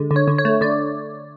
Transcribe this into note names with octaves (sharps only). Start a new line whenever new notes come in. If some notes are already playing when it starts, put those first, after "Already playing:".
Already playing: D3 G#3
D3
C#5
D3
C#5
A3
D3 D5